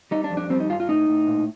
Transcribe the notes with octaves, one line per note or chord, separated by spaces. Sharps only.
G3 D#4
D4
F2
D4
G3 C4
D#4
G2 F4
F4
A2 D#4
A2
A#2